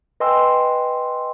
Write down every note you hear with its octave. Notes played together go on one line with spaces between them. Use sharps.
B4 D#5 G5 G#5 C6 E6